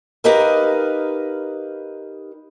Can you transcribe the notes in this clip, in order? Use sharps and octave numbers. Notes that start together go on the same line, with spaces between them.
D#4 G4 A#4 B4 D#5 F5